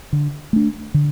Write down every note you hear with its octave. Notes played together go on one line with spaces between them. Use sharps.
D3
A3 D4
D3